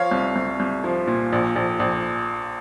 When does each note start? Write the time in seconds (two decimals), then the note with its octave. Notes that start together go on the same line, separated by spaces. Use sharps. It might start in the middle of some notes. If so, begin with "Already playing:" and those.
Already playing: F3 C#5 F5
0.11 C2
0.36 C2
0.60 C2
0.84 F3
1.07 A#2
1.32 A#1
1.56 A#1
1.79 A#1